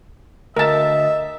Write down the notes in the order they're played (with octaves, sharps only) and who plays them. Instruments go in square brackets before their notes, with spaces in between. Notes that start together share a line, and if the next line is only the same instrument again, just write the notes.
[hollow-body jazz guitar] D2 [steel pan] A#4 A5 [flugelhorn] D#5 [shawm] E5